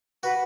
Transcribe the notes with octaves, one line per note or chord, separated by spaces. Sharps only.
F#4 B4